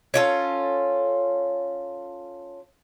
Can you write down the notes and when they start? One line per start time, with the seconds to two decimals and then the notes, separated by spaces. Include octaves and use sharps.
0.14 C#4 F4 A4